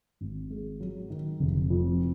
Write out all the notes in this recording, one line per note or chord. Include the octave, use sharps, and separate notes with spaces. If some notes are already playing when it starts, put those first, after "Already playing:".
G#1
G#3
F#3
D#3
F1
F2